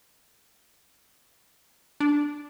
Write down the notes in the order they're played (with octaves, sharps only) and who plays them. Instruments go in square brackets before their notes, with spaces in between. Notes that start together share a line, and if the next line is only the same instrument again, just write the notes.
[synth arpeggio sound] D4